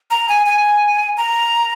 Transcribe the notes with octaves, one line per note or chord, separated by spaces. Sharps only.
A#5
G#5
G#5
A#5